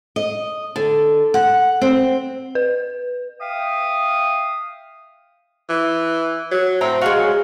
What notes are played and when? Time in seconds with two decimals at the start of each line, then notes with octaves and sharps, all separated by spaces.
0.16 D#5
0.76 D3
1.34 F#5
1.82 C4
2.55 B4
3.41 E5 F5 G5 D#6
5.69 E3
6.51 F#3
6.81 A2 C4 F#5 A#5
7.01 G#3 F#4 G#4 F5
7.16 F#3